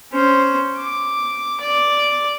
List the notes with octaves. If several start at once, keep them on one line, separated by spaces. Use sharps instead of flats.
C#4 C5
D6
D5